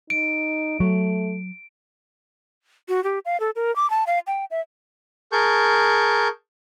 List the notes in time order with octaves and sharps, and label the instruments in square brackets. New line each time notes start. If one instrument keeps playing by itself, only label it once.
[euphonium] D#4 [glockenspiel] D7
[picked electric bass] F#3 [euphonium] A3
[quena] F#4
G4
F5
A4
A#4
D6
A5
F5
G5
E5
[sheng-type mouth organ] G#4 A#4 A5 C#6 G6